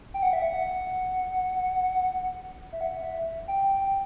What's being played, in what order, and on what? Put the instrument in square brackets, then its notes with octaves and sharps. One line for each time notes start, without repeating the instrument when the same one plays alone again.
[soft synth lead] G5
F#5
E5
F#5
E5
F#5
E5
G5
G5
G5